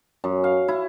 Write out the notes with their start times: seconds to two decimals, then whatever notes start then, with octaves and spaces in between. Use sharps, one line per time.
0.24 F#2
0.44 F5
0.68 E4